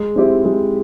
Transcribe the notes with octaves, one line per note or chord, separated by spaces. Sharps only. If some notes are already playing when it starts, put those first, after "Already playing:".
Already playing: G#3
C4 E4 G4 C5
G#3